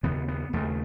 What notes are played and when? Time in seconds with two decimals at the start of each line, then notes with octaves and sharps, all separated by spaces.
0.03 D#2 C#3 B3
0.28 B3
0.53 D#2 C#3 A3